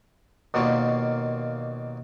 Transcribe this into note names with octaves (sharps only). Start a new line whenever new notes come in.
D#2 B2 A#3 F4 D5 C#6